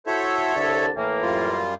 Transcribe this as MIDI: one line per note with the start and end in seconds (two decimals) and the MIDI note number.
0.07 0.54 64
0.07 0.54 66
0.07 0.86 69
0.07 0.54 72
0.07 0.86 73
0.07 0.86 76
0.55 0.89 36
0.55 0.89 50
0.55 0.89 81
0.96 1.59 45
0.96 1.59 52
0.96 1.59 58
1.22 1.75 42
1.22 1.75 55
1.22 1.75 65